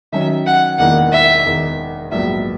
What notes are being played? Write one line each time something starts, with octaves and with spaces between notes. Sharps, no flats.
D#3 F#3 C#4 E5
F#5
E1 E2 D#3 A#3 E4 F#5
E5
E1 E2 D#3
A#1 G#2 F#3 B3 E5